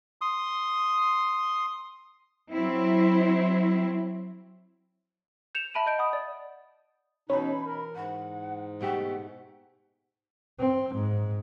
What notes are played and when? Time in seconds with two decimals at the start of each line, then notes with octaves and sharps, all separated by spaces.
0.21 C6 D#6
2.52 F#3 C4 E4
5.55 G6 C#7 E7 F7
5.74 E5 A5 B5 D7 D#7
5.86 D#5 G6 D7
5.98 F#5 B5 D#6
6.13 D5
7.30 B2 E3 C#4 D#4 B5
7.66 A#4
7.95 G#2 F#5
8.81 B2 A3 G4 F#5
10.60 C4
10.95 G#2